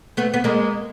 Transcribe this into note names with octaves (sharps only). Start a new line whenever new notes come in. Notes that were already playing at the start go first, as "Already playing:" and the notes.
A3 B3
B3
G#3 A#3